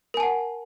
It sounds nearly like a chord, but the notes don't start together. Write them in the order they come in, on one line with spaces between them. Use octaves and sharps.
A#4 G#5 A5 F#5